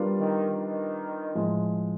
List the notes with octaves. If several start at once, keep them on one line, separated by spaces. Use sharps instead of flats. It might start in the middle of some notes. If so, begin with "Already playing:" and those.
Already playing: G3 B3 D4 F4 A#4
D#3
D#3
A2 F3 G#3